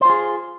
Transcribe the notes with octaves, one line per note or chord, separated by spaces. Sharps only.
F4 G#4 C5